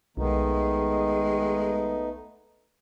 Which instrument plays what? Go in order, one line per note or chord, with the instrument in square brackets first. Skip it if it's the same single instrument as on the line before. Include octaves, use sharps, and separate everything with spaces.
[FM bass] B1 [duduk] D#3 [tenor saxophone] G#3 [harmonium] A3 B3 D#4